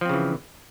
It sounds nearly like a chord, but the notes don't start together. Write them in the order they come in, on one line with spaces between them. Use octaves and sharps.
F3 C4 C#3 E3